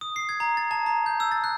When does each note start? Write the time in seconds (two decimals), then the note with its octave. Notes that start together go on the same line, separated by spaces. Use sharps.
0.01 D#6
0.16 C7
0.29 G#6
0.40 A#5
0.57 A6
0.71 A5
0.86 A#5
1.06 G6
1.20 E6
1.31 A6
1.44 F#6